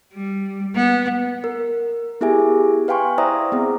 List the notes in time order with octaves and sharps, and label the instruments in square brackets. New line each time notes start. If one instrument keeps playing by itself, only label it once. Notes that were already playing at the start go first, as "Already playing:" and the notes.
[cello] G3
B3
[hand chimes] A#4
B3 E4 G4 G#4 E5 G#5
B4 F5 G5 G#5 C6 C#6
E4 C5 D5 E5 A#5 D#6
B3 C4 G#4